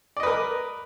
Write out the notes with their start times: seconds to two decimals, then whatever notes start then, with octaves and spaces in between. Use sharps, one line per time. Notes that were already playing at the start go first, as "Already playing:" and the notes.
0.17 D5
0.20 D#5
0.23 B4
0.26 A#4